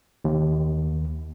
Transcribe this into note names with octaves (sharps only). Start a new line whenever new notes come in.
D#2